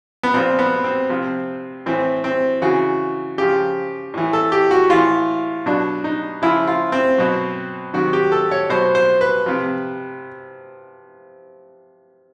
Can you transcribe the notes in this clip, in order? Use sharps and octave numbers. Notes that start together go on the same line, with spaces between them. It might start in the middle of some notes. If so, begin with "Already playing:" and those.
B3
A#2 F3 C4
B3
C4
C3 F3
A2 E3 C4
C4
C#3 E3 F#4
C#3 F3 G4
A2 E3
A4
G4
F#4
A2 E3 F4
B2 F#3 D4
D#4
C#3 F3 E4
F4
C4
B2 F#3
C3 D#3 F#3 F#4
G4
A4
C#5
B2 F#3 C5
C5
B4
C3 F3